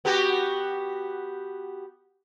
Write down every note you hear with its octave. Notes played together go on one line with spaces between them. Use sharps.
B3 F#4 G4